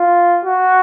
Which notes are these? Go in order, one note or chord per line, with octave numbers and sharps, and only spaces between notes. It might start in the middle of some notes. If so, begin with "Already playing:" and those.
Already playing: F4
F#4